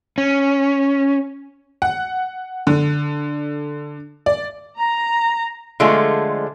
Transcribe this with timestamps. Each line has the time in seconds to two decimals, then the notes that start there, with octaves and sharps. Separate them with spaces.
0.18 C#4
1.82 F#5
2.67 D3
4.26 D5
4.77 A#5
5.80 D3 F3 G#3 A3 F4